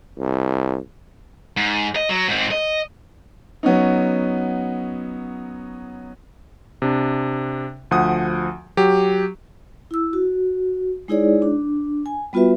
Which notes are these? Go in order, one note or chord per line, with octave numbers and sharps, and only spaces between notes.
C2
G#2
D#5
F#3
G#2 C4
D#5
F#3 B3 C#4 D#4
C3 D4
D2 F3 F#5 D#6
F#3 G4
E4 E6
F#4
G#3 D#4 E4 G#4 C#5 D5
D4
G#5
G3 B3 F4 F#4 B4 E5